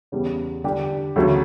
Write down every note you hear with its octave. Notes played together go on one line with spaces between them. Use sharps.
E2 C#3 G3
D3 G3 D4 G4
D2 C#3 F#3 A3